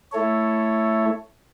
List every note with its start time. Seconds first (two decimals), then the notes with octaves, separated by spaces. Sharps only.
0.12 A3 E4 A4 C#5